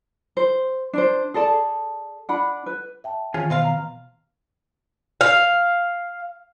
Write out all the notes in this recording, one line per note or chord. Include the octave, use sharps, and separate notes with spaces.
C5
D4 C5
G#4 A4 D5 A5
D4 F#5 B5
B4
E5 G5 A5
D#3 E3 C#4 F4 G#4
B2 C4 F4 F5
A#5
F5